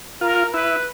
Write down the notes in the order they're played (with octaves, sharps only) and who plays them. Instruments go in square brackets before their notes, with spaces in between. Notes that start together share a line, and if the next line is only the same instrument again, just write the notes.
[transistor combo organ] F4 [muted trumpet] A#4
[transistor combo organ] E4 [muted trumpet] B4